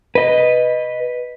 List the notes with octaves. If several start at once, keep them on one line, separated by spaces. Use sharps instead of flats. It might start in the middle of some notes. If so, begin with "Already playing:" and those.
B4 D#5